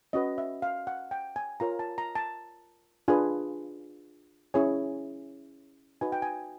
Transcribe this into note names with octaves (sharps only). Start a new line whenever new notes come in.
C#4 F#4 B4 D#5
E5
F5
F#5
G5
G#5
F4 A#4 C#5 A#5
A5
A#5
A5
D4 F4 G#4 B4 G#5
C#4 E4 G#4 C#5 G#5
D#4 F#4 B4 G#5
G5
G#5